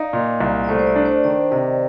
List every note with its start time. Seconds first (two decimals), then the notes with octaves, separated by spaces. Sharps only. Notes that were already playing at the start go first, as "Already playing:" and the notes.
Already playing: D#4 D5 D#5 F5
0.13 A#2
0.40 C2
0.64 D5
0.68 A3 C5
0.79 C5
0.87 D5
0.96 D4
1.05 C5
1.24 D#3 D5
1.52 C3 D#5